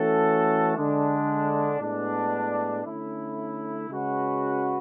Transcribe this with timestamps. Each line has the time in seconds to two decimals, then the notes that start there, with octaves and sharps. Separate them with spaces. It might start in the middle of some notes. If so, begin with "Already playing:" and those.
Already playing: E3 A3 C#4 F#4 A4
0.76 D3 G#3 D4
1.80 A2 G#3 B3 D4
2.85 D3 A3 C#4 E4
3.89 C#3 G#3 C#4 F#4 B4